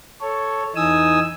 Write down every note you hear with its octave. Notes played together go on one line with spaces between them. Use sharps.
A4 C#5
E2 E3 D#4 G#5 D#6 E6